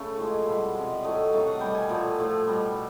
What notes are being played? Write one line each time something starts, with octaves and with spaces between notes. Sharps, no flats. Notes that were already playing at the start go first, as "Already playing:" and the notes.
Already playing: C#3 A3
A2 F3 G#3
F5
B2 G3 E5
C3 F3 G#3
D5
A2 F#3 A3 D#5
C3 D#3 F#3 A3 F5
F#5
B2 G3 G5
G#5
A#2 F3 A3 G5
A2 F3 A3
B2 G3